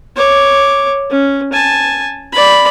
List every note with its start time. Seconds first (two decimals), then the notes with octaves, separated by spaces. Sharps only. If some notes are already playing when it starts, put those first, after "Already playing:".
0.16 C#5 D6
1.10 C#4
1.53 G#5 A5
2.33 D5 B5